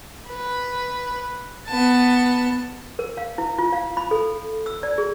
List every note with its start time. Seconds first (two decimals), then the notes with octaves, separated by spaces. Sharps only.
0.29 B4
1.68 B3 A5
2.99 A#4
3.17 F5
3.38 E4
3.58 F4
3.73 F5
3.97 B5
4.11 A4
4.66 E6
4.83 D5
4.98 G#4